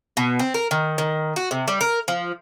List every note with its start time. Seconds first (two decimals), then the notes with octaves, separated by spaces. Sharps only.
0.17 B2
0.39 C4
0.54 A#4
0.71 D#3
0.98 D#3
1.36 F#4
1.51 C3
1.68 G3
1.81 A#4
2.08 F3